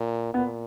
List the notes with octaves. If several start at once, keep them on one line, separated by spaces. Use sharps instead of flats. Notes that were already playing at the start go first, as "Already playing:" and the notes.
Already playing: A#2
A#2 B3